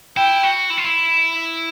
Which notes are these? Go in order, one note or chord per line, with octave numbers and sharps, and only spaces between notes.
E4 G5
F#4
E4
F4
E4